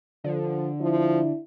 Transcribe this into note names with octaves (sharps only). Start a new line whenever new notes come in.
D3 F3
F3 E4